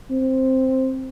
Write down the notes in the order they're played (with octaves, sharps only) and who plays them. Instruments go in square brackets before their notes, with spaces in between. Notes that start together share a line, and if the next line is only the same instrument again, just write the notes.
[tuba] C4